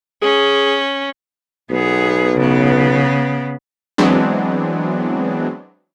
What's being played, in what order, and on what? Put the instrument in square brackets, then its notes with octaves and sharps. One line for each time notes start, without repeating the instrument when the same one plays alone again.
[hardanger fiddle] C#4 [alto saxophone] G#4
[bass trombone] B1 [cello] B3 G#4
[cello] C#3 B3
[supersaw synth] E3 F#3 G#3 B3 C4 D4